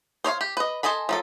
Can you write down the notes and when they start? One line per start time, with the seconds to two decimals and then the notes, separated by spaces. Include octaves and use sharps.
0.24 C5 C#5 D#5 F5
0.41 G4
0.57 B4 D#5
0.83 A4 C5 D#5 G#5 B5
1.09 F3 F#3 A4